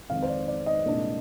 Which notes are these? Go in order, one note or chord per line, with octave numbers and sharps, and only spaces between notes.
F2 D#3 G#3 C4 F5
C5
D5
D5
D#5
C2 A#2 G#3 D4